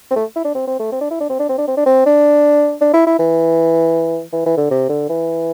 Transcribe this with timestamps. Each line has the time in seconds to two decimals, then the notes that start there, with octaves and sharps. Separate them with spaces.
0.11 C4
0.16 A3
0.36 E4
0.45 D4
0.55 C4
0.67 C4
0.80 A3
0.92 C4
1.01 D4
1.11 E4
1.21 D4
1.30 C4
1.40 D4
1.49 C4
1.58 D4
1.68 C4
1.77 D4
1.86 C4
2.06 D4
2.81 D4
2.94 E4
3.07 E4
3.19 E3
4.33 E3
4.46 E3
4.58 D3
4.71 C3
4.90 D3
5.09 E3